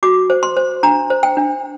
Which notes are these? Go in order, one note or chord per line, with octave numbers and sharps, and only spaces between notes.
F#4 D6
C5
C6
C5
D4 A#5
C5
G5
D4